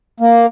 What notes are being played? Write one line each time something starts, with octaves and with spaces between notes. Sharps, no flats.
A#3